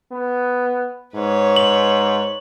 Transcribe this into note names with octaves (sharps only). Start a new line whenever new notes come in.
B3
G#2 B4 C#5
F#7